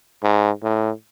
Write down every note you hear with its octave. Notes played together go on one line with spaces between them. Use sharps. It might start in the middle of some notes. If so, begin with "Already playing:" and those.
G#2
A2